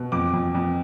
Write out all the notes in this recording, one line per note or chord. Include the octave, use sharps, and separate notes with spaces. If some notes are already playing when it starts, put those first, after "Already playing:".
Already playing: B2
F2 D6
F2
F2